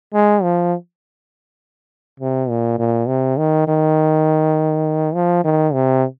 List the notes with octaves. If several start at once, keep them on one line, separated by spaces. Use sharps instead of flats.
G#3
F3
C3
A#2
A#2
C3
D#3
D#3
F3
D#3
C3